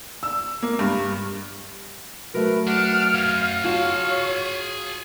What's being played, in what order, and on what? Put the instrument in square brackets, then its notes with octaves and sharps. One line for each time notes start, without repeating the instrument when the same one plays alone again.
[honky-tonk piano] E6
A#3
G2
[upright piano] F#3 A3 [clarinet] A#4 [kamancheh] B4
[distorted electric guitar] D4 [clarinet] F#5 [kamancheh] F6
[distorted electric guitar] F#2 [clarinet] F5
[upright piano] F4 F#4 [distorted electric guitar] G#4 A5 [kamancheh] C#5